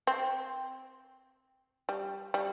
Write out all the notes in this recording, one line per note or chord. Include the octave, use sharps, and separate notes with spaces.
C4
G3
G3